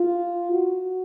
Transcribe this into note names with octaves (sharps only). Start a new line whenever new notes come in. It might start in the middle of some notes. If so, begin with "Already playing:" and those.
Already playing: F4
F#4